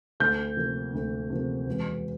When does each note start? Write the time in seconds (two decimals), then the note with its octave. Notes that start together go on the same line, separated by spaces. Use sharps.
0.20 D2 G6
0.57 C3 F3 A#3
0.94 D2
1.30 C3 F3 A#3
1.67 E1